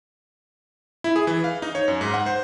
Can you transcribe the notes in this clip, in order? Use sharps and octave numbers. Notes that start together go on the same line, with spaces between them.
E4
G#4
E3
F5
D#4
C#5
F#2
G#2
F#5
C5